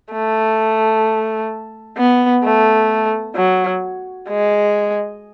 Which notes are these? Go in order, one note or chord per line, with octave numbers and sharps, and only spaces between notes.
A3
B3
A3
F#3
G#3